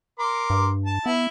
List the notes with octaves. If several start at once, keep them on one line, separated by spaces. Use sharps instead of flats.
A#4 C6 D6
G2
A5
B3 E4